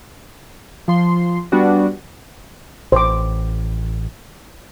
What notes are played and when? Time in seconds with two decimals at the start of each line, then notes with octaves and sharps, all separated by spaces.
0.88 F3 C6
1.52 G3 B3 D4 F#4 D5
2.92 A1 C5 D6